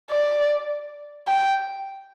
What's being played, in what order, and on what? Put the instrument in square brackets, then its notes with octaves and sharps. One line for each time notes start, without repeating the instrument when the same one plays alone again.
[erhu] D5
G5